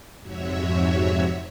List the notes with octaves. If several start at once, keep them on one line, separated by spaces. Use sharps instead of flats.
F2 G#2 C3 F#4 C#5 E5